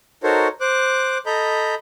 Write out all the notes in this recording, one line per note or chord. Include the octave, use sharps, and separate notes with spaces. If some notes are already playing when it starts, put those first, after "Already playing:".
D#4 F#4 A4 A#4 C5 C#5
C5 D6 F#6
A4 D#5 A#5 B5 G6